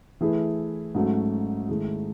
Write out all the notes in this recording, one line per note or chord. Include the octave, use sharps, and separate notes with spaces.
E3 A3 E4 G#4
G#2 F#3 A3 C#4 F#4
G#2 D#3 A3 E4 G#4